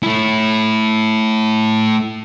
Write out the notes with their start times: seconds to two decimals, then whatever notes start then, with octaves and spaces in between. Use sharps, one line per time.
0.03 A3 E4